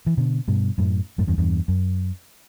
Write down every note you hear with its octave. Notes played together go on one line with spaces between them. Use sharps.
E3
B2 D3
G2 B2
F#2 A2
F#2 A2
E2 G2
E2 G2
F#2